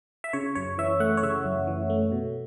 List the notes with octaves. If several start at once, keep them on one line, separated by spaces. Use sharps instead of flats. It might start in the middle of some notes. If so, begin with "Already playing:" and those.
E5
C#3 C#5
F#2 C#5
E3 E5
A3 F#5
C#5
C#3 E5
F#2
E3
A3
B2